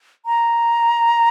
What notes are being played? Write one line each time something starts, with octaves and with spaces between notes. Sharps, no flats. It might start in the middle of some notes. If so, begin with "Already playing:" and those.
A#5